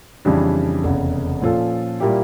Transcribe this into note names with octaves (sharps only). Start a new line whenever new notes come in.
F2 C#3 E3 G3 D4
F1 E2 C#3
A#2 F3 C#4 F4 A4
A#2 G3 A#3 E4 G4